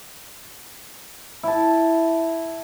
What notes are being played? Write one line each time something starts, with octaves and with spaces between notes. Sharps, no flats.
E4 A5